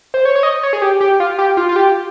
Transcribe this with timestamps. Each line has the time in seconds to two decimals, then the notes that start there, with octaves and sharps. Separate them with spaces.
0.14 C5
0.25 C#5
0.35 C#5
0.43 D#5
0.63 C#5
0.73 G#4
0.82 G4
1.01 G4
1.20 F4
1.38 G4
1.57 F4
1.69 F4
1.76 G4